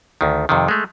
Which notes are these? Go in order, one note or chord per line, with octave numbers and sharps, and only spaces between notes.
D2 D#3
F2 C3 D#3
G#3 A3